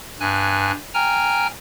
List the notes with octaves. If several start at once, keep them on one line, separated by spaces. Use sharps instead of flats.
G2 G#5 F#6
G5 G#5 A#5 F6